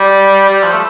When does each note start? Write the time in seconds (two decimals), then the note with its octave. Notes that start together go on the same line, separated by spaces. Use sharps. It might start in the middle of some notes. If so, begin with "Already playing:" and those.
Already playing: G3
0.49 G3
0.64 F3
0.72 A3